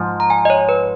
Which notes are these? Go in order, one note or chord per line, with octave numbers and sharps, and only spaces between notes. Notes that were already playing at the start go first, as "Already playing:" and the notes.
Already playing: G#2 F3
A#5
G#5
D#5
C#5
B4